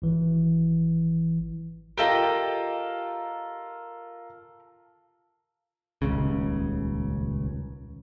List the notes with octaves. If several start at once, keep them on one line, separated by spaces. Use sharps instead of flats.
G#1 E3
F4 G4 A4 A#4 D#5
D#1 G#1 C#2 C#3